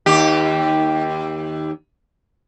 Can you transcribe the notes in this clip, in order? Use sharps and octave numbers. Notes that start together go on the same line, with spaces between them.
D#2 G4